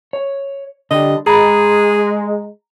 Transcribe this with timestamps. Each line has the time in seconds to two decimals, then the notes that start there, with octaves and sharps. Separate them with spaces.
0.13 C#5
0.91 D3 G3 D#5
1.27 G#3 G#4 A#5 B5